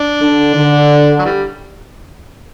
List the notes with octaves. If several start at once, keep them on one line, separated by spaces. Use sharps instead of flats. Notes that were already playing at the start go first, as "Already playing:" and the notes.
Already playing: D4
D3
D3
F#3
E3 G3